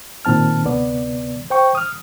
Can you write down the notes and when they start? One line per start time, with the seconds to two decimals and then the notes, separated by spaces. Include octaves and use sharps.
0.25 A#2 D#3 C4 A5 F6
0.65 D2 C3 B3 D5
1.50 C5 G5 C#6
1.75 D#6 F6